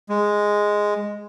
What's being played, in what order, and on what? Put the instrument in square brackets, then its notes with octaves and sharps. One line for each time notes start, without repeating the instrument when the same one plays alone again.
[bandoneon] G#3